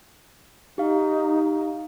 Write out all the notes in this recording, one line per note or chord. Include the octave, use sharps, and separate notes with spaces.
D#4 G4 F5